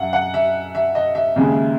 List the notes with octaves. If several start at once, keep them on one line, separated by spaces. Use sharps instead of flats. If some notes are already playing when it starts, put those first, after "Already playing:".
Already playing: F#2 E5 F#5
F#5
E5
E5
D#5
E5
D#2 C#3 G#3